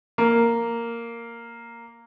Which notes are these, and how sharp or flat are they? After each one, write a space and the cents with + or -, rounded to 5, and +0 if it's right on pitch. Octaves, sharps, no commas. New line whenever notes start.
A#3 -5